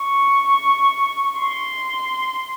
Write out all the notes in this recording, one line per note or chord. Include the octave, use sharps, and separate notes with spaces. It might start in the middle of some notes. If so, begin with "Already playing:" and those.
Already playing: C#6
C6